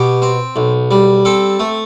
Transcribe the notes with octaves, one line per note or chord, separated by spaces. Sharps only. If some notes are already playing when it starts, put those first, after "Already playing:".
Already playing: B2 G4
C4
B1
G3
C4 A4
A3